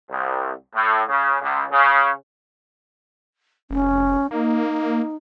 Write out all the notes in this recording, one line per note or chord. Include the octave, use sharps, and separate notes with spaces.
C2
A2
C#3
C#2
C#3
F1 C#4
A#3 D#4